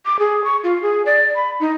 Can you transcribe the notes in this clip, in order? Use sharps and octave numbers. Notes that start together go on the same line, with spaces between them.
D6
G#4
C#6
F4
G#4
D5
B5
D#4